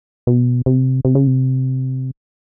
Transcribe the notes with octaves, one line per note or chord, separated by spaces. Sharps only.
B2
C3
C3
C#3
C3